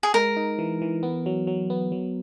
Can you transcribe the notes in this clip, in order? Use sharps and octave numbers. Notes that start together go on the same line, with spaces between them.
G#4
G#3 A#4
D#4
E3
E3
B3
F#3
F#3
B3
F#3